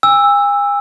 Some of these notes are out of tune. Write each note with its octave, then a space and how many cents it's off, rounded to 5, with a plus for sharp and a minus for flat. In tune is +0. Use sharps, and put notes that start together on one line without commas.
G#5 -40 E6 +0